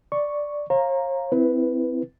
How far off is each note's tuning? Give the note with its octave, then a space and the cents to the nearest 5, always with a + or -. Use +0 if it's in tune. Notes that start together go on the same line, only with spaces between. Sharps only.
D5 +0 C#6 +0
C#5 -45 F5 +0 A#5 +0
C4 -20 E4 +0 B4 +0